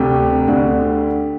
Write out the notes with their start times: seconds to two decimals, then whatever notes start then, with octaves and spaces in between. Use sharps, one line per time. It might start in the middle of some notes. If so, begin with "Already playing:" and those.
Already playing: D2 C3 G4
0.48 D2 D3